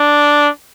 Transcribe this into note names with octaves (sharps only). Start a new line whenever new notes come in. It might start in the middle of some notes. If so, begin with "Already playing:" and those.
Already playing: D4